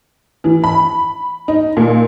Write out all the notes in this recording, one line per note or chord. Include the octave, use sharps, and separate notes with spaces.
E3
B5
D#4
A#2